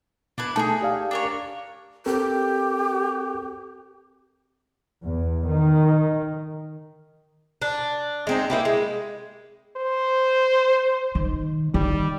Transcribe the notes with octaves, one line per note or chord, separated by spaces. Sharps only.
B2 D4 E4 B4
A3 D#4 E4 G#4 A5
G4 D5 F5
D4 A#4 C#5
C4 G4 A4 A#4
E2
D#3
D4
G#3 C4 D#4
A#3 E4 G4
G#3
C5
D#3
D#3 G3